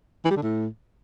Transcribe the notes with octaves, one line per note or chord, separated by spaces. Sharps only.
E3
G3
D3
A2